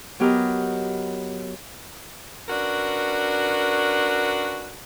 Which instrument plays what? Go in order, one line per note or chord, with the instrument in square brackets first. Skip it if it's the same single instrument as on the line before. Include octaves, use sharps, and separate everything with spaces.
[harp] F#3 B3 G4 A#4 D#5
[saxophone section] C#4 D4 F#4 A#4 B4